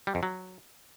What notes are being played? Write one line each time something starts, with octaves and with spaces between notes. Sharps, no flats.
G3
F2
F#3